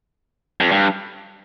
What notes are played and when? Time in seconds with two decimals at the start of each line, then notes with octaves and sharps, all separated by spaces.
0.61 F2
0.72 G2